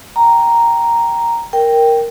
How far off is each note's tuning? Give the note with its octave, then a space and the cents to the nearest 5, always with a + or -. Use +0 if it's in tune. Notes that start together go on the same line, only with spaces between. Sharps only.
G5 -10 A#5 +0
A#4 +0 G5 +0